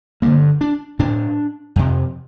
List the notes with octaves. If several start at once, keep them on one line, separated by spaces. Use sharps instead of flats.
G2 D3 A#3
D4
A2 D4
F2 C3